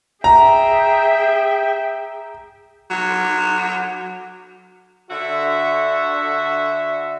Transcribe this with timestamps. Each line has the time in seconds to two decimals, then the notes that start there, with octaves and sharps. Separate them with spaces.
0.24 G#4 E5 G5 A#5
2.90 F#3
5.10 D3 F#4 E5